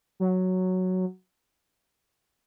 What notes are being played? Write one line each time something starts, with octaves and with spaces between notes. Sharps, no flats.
F#3